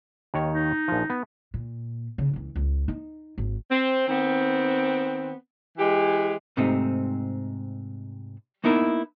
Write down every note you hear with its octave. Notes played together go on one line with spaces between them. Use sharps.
D#2 D#3 C#5
D#4
A#1 F3
B3
A#2
C#3
C#2 E3
C#2
D#4
G#1
C4
D#3 B3 C4
E3 G#3 G4
G#2 C3 A3 C4 D#4
A#3 B3 D#4 E4 A#4